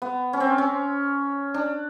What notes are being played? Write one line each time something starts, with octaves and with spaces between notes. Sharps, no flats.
B3
C#4
C4
C#4
D4